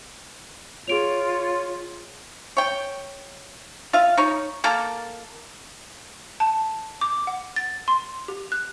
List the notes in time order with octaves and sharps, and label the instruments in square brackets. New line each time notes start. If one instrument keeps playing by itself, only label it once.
[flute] F4 [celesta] G#4 D7 F7 [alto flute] C#5
[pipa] C#5 G5
F4 E5 F5
D#4 C#5
A#3 A4 A#4 A5
[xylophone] A5
D6
F#5
A6
C6
G4
F#6